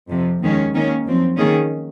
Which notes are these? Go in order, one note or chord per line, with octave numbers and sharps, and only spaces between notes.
F2 C3 F3
D#2 D#3 G#3 C#4
D#3 A#3 C#4
F#2 F3 C4
D#3 A#3 C#4 G#4